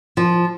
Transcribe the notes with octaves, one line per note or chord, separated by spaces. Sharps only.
F3